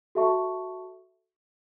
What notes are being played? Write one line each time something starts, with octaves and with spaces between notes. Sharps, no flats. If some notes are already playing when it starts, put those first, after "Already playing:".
F#4 A4 E5 A5 C#6